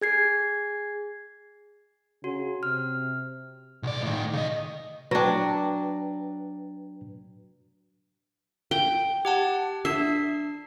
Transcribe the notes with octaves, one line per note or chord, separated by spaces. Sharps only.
G#4 G#6 C7
C#3 F#4
C3 F6
B1 D5
A2 D#3
C#3 D#5
F#3 D4 B4 G5
G5
G4 F#5 A5
D4 E5 C7